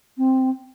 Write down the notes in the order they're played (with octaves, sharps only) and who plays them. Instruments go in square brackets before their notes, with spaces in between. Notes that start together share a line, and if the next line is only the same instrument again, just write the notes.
[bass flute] C4